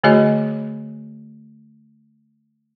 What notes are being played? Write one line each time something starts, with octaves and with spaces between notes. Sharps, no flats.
D3 A3 F#4 G#4 C#5 D#5